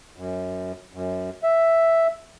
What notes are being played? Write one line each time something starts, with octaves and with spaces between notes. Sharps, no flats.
F#2
F#2
E5